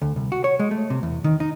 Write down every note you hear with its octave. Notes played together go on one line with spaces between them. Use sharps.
D2
C2
F#4
C#5
G#3
A3
C3
E2
D#3
D#4